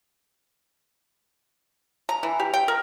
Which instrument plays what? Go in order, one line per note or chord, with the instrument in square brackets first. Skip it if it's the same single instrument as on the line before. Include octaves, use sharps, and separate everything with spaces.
[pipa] A#5
E3
G4
G5
A#4